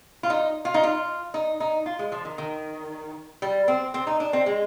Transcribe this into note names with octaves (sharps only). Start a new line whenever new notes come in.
F4
D#4
F4
D#4
F4
D#4
D#4
F4
G#3
F3
D#3
D#3
G3
C4
C4
D#4
D4
C4
G#3